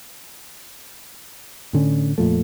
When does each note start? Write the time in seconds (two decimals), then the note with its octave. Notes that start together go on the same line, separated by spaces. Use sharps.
1.73 A2 D3 C#4
2.18 F2 A#2 F3 A3